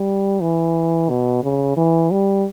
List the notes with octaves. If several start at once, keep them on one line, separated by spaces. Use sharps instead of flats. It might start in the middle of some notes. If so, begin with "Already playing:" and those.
Already playing: G3
E3
B2
C#3
E3
G3